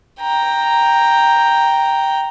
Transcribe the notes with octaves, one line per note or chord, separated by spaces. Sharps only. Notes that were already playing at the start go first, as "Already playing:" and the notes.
G5 A#5